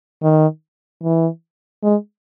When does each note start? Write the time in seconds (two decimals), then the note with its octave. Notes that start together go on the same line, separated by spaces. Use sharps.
0.22 D#3
1.03 E3
1.83 G#3